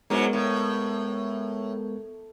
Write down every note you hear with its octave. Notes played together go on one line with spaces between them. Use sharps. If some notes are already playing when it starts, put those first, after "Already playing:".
G#2 F#3 G#3 B3 A#4
A2